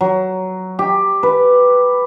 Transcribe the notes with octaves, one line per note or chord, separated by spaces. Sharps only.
F#3
G4
B4